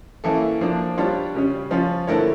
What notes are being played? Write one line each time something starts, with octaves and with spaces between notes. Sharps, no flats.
E3 A#3 C#4 E4 A4
F3 A#3 D4
G3 D4 F4 C#5
C#3 G3 C#4
F3 C#4 F4
D3 A3 E4 A#4 C#5